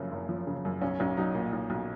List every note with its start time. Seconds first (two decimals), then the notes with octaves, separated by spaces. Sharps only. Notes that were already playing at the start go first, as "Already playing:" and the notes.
Already playing: F#1 F#2 C#3 F3
0.12 F#1
0.29 F3
0.47 C#3
0.65 F#2
0.82 B1 C#4
1.00 B1 C#4
1.17 F#3 D#4
1.35 A#2
1.53 B1
1.70 B1